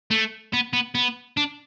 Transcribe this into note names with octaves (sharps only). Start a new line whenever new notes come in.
A3
B3
B3
B3
D4